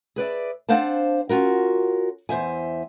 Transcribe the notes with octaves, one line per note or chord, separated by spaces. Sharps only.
G#4 B4 D5 E5
C4 D4 C5 F5 F#5 A5
C#4 F4 F#4 A#4
E2 C5 E5 G#5